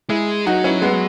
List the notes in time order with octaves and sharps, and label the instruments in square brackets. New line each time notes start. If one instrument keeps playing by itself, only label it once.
[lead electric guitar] G#3 [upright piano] E4 G#4
[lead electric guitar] F#3 [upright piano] D#4 F#4
[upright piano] C#4 E4
G#3 B3